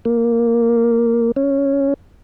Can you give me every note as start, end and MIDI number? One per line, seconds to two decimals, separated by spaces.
0.05 1.32 58
1.36 1.94 61